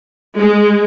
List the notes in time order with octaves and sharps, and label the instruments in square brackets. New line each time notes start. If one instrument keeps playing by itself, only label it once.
[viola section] G#3